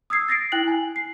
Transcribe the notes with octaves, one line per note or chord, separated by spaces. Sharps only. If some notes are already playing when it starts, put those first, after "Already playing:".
D#6 E6 G#6 C7
A6 A#6 C7 D7
E4 G5 F#6 F#7
G#5
C7